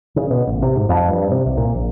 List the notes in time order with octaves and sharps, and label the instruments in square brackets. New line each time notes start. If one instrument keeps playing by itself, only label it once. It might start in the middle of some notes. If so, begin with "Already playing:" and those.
[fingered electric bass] C#3
B2
A1
C3
G#2
F2
G2
C3
C2
A#2
A#1